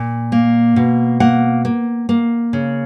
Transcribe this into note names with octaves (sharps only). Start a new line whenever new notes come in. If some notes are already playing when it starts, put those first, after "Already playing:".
Already playing: A#2
A#3
B2
A#3 F#5
A#3
A#3
C#3